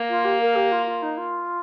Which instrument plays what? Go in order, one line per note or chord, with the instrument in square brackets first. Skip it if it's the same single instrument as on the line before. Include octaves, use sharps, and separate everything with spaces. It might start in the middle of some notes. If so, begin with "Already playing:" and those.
Already playing: [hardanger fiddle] A#3
[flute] F4
G4
A#4
G4
F4
F4
D#4
F4